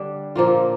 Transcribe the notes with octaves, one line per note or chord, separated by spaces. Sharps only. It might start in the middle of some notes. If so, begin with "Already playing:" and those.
Already playing: D3 G3 D4
A#2 F3 A#3 F4